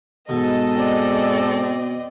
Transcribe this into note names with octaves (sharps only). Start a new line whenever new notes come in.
G#2 B2 G#3 A4 D#5
C4 D5